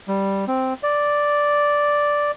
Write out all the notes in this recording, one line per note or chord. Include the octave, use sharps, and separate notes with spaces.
G3
C4
D5